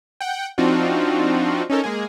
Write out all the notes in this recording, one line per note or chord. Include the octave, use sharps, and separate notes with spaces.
F#5 G5
F3 C4 D4 D#4 F4 F#4
C#4 D#4 A4 A#4
G#3 A#3 G#4